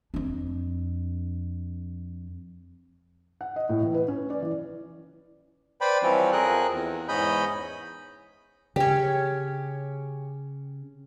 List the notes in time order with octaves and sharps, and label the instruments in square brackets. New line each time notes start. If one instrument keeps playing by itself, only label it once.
[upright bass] F2 D4
[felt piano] F#5
D#5
A2
E3
B4
C#4
D5
E3
[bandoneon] B4 C5 D5 G5 B5
E3 F3 G3 C4 C#4
F2 F3 C4 G#4 A#4 F#6
E2
E2 G#2 C#4 D#5 B5 G6
[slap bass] C#3 [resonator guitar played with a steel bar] C#4 G4